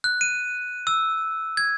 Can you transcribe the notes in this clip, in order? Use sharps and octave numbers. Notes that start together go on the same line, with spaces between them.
F#6
D#7
E6
G#6